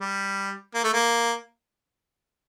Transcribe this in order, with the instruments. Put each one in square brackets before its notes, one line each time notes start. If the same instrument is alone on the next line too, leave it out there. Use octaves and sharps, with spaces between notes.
[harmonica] G3
A#3
A3
A#3